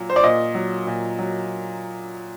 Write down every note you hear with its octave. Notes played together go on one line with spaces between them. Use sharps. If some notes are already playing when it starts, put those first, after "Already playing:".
Already playing: A#2 F#3
C5
D5
A#2 D#5
F#3
A#2
F#3